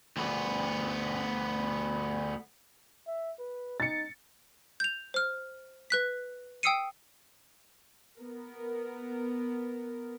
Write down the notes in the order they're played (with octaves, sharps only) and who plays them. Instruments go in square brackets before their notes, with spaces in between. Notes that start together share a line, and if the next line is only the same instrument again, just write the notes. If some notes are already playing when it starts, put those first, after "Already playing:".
[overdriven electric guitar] D2 B3
[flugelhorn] E5
B4
[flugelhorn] D#4 [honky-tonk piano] A6 C#7
[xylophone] G6 F7
C5 F6
B4 F#6 B6
G5 D#6 E6 C7 C#7 D#7
[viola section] B3 A#4